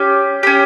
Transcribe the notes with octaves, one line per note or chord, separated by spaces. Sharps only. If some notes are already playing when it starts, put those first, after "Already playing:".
Already playing: C#4 G4
C#4 G4